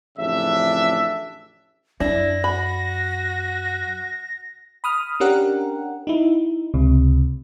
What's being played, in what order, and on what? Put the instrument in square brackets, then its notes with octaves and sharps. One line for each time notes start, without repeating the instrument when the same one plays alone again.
[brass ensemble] A1 F2 C#3 D4 E5
[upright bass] F#2 [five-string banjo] D4 [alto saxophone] E4 [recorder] A#6
[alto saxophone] F#4 [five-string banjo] B5
[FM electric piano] B5 D#6 F6
C#4 D4 G4 A#4 F#5
D#4 E4
C#2 C3